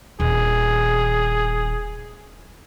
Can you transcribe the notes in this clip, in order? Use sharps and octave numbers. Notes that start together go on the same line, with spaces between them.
D#1 G#4